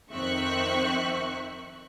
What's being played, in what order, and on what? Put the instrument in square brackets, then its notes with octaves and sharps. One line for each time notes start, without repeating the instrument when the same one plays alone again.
[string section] F2 D#3 C4 E5 C#6 F#6